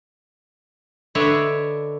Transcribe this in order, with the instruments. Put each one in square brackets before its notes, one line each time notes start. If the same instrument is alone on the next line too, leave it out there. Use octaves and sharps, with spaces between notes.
[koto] D3 D4 B4 C#5 D#5 E5